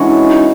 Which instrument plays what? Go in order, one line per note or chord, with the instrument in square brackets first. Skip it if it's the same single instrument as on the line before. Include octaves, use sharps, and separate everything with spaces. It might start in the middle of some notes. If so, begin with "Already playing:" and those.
Already playing: [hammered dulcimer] E3 G#3 C#4 F#4 [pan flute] D4
[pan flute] D#4